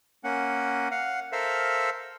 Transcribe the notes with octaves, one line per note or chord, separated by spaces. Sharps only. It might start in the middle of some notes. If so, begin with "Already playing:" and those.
A#3 C#4 F#5
F5 F#5
A4 A#4 C5 E5 F5